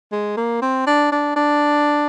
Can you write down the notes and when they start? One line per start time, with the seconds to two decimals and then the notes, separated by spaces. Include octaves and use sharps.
0.12 G#3
0.37 A#3
0.62 C4
0.87 D4
1.12 D4
1.36 D4